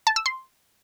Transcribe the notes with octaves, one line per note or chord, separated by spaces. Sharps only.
A5
E6
C6